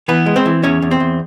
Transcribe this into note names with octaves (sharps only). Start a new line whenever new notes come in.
E3 B3 B4
G#3
C4 C5
E3
E2 C#4 C#5
E2
C4 C5
E2